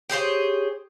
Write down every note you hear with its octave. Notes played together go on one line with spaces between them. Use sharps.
G4 G#4 C5 C#5